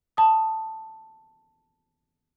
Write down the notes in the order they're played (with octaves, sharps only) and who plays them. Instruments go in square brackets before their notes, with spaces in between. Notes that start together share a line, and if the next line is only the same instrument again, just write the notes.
[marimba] A5 D#6